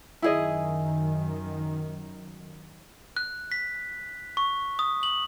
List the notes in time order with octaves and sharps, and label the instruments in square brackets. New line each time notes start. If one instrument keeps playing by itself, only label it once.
[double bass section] F#2 D#3 [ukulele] E4 G#4 D#5
[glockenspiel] F#6
B6
C#6
D#6
F#7